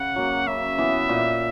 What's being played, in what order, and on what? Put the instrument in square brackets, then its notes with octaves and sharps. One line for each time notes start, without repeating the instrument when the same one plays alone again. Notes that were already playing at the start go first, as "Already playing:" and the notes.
Already playing: [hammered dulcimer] C#3 [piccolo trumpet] F#5
[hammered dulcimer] F#3 A#3
[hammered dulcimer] C#3 [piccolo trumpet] E5
[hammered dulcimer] E3 B3
A#2